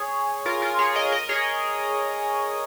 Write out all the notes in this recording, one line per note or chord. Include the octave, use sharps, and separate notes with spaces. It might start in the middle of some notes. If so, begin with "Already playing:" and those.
Already playing: G#4 C#5
F4 A#4
F4 A#4
G#4 C#5
A#4 D#5
A#4 D#5
G#4 C#5